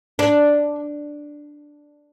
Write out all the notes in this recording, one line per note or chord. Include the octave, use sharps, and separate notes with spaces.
D4